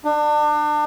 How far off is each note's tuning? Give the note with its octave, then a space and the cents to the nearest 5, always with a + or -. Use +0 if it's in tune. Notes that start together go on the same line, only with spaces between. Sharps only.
D4 +30